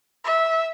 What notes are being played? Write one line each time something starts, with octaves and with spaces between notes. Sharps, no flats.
E5